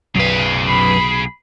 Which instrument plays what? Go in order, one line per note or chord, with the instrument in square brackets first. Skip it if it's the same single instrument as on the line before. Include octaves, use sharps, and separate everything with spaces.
[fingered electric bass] B1 [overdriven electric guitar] F#2 B4 [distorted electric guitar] G#4 F5
[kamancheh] B5